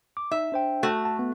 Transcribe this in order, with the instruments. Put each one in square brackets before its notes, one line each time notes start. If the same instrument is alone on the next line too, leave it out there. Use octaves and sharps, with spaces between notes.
[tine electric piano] D6
[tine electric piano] D#4 [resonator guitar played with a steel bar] E5
[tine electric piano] D4 C5 G5
[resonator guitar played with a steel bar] A3 F#4
[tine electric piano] A5
B3